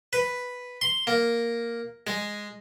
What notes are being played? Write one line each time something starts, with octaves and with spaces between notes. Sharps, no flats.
B4
C6
A#3
G#3